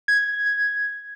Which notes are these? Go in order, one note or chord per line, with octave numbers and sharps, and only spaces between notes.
G#6